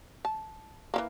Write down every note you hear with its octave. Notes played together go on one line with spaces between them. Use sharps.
A5
E3 F#3 A#3